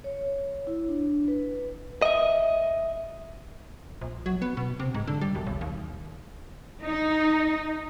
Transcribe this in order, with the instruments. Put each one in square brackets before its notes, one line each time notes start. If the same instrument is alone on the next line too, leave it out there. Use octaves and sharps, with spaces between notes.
[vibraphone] C#5
E4
D4
B4
[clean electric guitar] D#5 E5
[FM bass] A#1
F#3
B3
B2
C3
G#2
D3
G3
E1
B1
D#2
[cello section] D#4